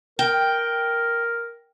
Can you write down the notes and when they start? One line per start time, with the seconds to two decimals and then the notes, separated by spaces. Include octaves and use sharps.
0.19 A#4 G5